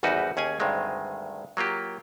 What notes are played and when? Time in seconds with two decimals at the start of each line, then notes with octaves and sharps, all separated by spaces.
0.03 G#1 E2 G3 D#4 F#4 B4
0.37 D#2 C#4 G#4 G#5
0.60 D2 G2 D#3 G#3 C4
1.57 F#3 A#3 F4 G4